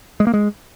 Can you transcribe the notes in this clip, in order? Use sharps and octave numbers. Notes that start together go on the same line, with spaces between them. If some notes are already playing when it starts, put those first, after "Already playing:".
G#3
A#3
G#3